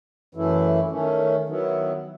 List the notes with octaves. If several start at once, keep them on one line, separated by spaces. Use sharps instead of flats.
F#2 E3 A3 E4
D#3 A3 C#4
D#3 F#3 B3 E4